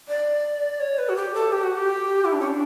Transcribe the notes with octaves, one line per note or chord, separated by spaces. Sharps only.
D5
C#5
B4
F#4
G4
A4
G4
F#4
G4
E4
D4
C#4
D4